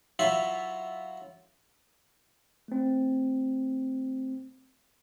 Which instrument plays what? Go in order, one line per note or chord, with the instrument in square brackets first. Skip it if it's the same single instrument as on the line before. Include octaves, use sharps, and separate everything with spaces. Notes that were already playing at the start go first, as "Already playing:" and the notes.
[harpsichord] F#3 E4 F4 E5
[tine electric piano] A3 C4